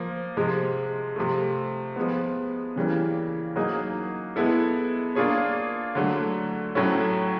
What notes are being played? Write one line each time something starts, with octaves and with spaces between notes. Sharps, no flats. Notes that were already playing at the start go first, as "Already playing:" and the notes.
Already playing: F3 A#3
C3 F3 G#3
C3 F3 A3
F3 G#3 B3
C#3 E3 G3 A#3 C#4
F#3 A#3 D#4 G#4
G#3 B3 E4 A4
A#3 D4 F4 G#4 C#5
D3 F#3 A3
A2 F#3 A3 C#4 E4